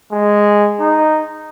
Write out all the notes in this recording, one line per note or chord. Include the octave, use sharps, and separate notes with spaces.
G#3
D#4